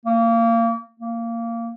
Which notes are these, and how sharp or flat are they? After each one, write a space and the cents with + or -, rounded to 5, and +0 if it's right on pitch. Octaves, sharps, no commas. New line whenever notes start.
A#3 -25
A#3 -15